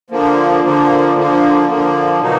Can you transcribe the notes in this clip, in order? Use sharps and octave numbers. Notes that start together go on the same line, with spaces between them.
D3 F3 A#3
D3 F3 A#3
D3 F3 A#3
D3 F3 A#3
B2 F#3 A#3 D#4